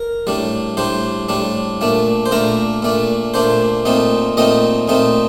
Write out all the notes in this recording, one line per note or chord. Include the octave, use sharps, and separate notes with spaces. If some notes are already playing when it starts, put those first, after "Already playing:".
Already playing: A#4
A2 G3 D4
A2 G3 D4 C5
A2 G3 D4
A#2 A3 D4
C5
A#2 A3 D4 A#4
A#2 A3 D4
A#2 A3 D4 C5
A#2 A3 C4 D#4
A#2 A3 C4 D#4 D#5
A#2 A3 C4 D#4